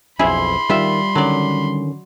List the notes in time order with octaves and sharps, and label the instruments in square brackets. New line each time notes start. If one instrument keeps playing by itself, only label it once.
[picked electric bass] B1 F2 [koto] E4 G#4 [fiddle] B5 C6
[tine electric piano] D#3 [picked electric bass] G3 [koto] F4 E5
[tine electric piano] D3 D#3 C#4 [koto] F#3 D5